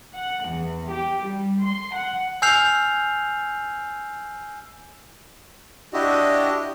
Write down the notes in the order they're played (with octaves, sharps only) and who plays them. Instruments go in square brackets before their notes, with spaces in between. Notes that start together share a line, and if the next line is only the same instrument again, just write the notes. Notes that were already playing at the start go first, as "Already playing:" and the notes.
[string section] F#5
E2
G4
G3
C6
F#5
[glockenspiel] G#5 E6 F6 G6 C7 F7
[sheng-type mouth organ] D4 E4 F#4 G4 D#5